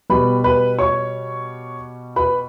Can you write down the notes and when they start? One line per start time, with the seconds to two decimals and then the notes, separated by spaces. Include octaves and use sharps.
0.10 B2 G3 B4 B5
0.44 B4 B5
0.79 C#5 C#6
2.16 B4 B5